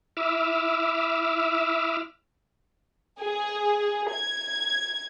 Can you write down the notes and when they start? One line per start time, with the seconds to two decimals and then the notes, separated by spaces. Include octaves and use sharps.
0.17 E4 E5 D6 E6 F6
3.19 G#4
4.11 G#6